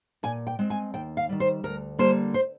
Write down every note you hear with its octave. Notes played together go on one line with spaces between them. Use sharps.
A#2 G#5
G5
G#3 C4
G#5
D#2 G5
F5
D#3 G3
C5
D2 A#4
D3 G3 A#3 C5
C5